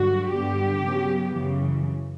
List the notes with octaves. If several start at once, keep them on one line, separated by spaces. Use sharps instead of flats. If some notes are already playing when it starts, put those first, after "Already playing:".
Already playing: G2 D3 F#3 F#4
G2 D3 G3 B3 G4
C#3 F#3 B3
F#2 C#3 E3